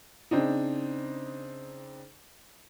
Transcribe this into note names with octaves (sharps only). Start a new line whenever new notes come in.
C#3 C4 D4 D#4